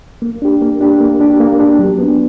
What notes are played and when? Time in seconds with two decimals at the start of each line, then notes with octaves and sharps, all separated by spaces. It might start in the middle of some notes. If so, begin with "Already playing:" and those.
0.22 A#3
0.42 D4 G4
0.61 A#3
0.81 D4 G4
1.01 A#3
1.20 D4 G4
1.40 A#3
1.60 D4 G4
1.79 F#3
1.99 B3 D4